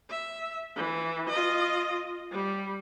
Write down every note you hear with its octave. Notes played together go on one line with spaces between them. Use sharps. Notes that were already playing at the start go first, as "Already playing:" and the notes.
E5
E3
F4 D#5
G3